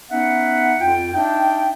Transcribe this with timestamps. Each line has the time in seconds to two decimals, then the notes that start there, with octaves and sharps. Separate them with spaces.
0.10 B3 C#4 D#4 E5 F#5
0.80 F2 F4 G5
1.13 D4 D#4 E5 G5